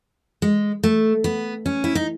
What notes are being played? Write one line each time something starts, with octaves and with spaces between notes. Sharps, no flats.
G#3
A3
B3
C#4
E4
D#4